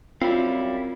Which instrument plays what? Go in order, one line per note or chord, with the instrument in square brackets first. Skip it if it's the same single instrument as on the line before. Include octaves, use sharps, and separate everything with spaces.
[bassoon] F#2 [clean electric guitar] G3 E4 F5 [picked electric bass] C4 [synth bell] F4